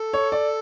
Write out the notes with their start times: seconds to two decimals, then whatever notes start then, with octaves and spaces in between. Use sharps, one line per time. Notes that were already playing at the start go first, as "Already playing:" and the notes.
Already playing: A4
0.13 C#5
0.32 D5